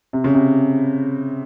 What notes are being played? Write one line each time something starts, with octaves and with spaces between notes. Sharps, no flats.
C3
C#3
C3